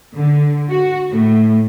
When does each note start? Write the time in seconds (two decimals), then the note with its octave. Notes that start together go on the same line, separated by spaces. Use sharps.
0.14 D3
0.69 F#4
1.10 A2